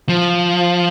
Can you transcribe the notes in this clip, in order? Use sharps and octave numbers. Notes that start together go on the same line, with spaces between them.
F3